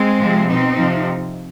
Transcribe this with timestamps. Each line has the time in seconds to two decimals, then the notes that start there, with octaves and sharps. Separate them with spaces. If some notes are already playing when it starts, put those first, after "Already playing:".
Already playing: G#3 C4
0.20 C3 F3
0.49 B2 C4 D#4
0.79 C3 F3